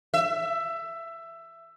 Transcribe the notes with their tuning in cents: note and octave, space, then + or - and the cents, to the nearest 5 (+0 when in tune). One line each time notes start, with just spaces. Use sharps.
E5 +15